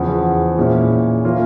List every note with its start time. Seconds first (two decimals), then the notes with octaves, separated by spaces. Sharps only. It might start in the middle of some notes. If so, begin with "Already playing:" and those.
Already playing: E2 C#3 F3
0.58 A#2 G#3 C#4 E4
1.24 E3 A#3 C#4 F4